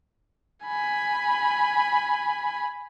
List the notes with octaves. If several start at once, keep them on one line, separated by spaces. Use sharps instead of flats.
G#5 B5